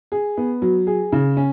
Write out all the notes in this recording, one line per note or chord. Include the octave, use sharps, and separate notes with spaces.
G#4
B3
F#3
G#4
C#3
C#4